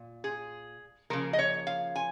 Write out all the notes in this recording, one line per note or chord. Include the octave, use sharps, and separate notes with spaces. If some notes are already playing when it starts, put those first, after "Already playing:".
Already playing: A#2
G#4
C#3 F3 A#3 A#4
D#5
C#5
F5
G#5